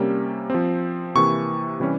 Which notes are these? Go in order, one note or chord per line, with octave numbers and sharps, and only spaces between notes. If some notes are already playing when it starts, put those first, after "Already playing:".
Already playing: C3 G3 A#3 C#4
F3 C4
C3 E3 A#3 C#6
C3 E3 G3 C#4